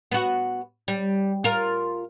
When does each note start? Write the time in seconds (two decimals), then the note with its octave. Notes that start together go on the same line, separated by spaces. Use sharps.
0.11 B3 F#4
0.88 G3
1.44 F4 A#4